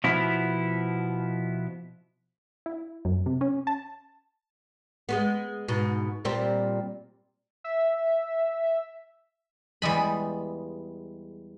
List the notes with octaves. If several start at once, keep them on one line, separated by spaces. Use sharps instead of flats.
B2 F3 B3 E4
E4
F#2
C3
C#4
A5
G#3 A3 B3
G#2 B2
A#2 G3 C4
E5
E2 G3 G#3 B5